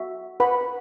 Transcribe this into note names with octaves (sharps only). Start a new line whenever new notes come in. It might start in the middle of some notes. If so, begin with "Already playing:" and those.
Already playing: F#4 E5
B4 F#5 B5